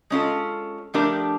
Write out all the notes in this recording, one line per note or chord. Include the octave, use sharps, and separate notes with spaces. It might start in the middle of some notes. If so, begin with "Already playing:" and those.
G#3 C#4 F4 A4
F3 A3 D4 G4 A#4